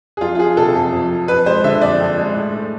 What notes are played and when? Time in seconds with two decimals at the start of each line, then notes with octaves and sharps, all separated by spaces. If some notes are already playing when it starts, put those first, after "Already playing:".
0.17 G#4
0.21 F2 F4
0.35 F4
0.39 F3 G#4
0.57 C3 A4
0.75 F2
0.92 F2
1.11 F3
1.28 F2 B4
1.46 G#3 C5
1.64 D3 E5
1.82 F2 D5
2.00 F2
2.18 G#3
2.35 A2
2.54 A3